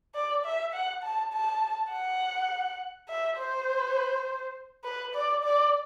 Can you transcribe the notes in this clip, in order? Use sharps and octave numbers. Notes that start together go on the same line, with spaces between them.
D5
E5
F#5
A5
A5
F#5
E5
C5
B4
D5
D5